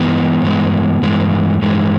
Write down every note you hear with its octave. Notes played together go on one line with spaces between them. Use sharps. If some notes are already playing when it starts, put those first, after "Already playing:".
Already playing: G2 E3 G#3 B3
G2 E3 G#3
G2 E3 G#3
G2 E3 G#3